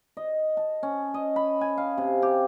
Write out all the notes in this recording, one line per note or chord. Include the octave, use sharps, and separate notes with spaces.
D#5
A5
C#4
D#5
B5
G#5
F5
C3
G4